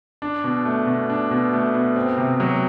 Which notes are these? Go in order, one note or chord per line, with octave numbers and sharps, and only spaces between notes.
D4
B2
A3
B2
D4
B2
A3
B2
C4
C3
F#3